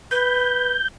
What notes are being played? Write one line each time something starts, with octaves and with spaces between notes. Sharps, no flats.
B4 G6